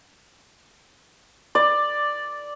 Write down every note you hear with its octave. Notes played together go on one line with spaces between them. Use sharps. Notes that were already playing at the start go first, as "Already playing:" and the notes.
D5